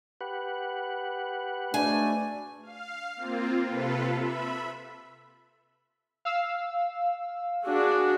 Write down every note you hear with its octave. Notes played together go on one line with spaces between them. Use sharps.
G4 B4 F#5
G#2 B2 A3 D4 G#5
F5
A#3 C4 F4
C3 F4 A4 B4
E5 B5
F5 E6
D4 F#4 G#4